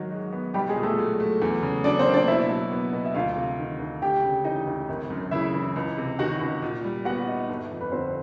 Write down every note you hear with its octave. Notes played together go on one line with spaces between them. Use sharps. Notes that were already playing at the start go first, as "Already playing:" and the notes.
Already playing: G#2 D#3 F#3 F#4
G#3
B3
B1 G3 G4
G#3 G#4
A#2
A3 A4
F#3
A3
E2
C#3
F#3 D4 D5
C4 C5
A#3
D4 D5
B2 E4 E5
F#3
B3
B2
E5
D2 F4 F5
C3
D#3
D2
D2 G4 G5
C#3
E3 D#4 D#5
D2
G#1
F#2
C#3 E4 E5
E3
C#2
C3
D#3 F#4 F#5
C#2
A#2
G3
B3 F#4 F#5
D#4
G1
F2
B4
D3 C4 C5